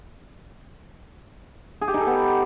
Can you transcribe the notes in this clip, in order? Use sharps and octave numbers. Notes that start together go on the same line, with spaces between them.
G#4
G4
D#4
A4
B3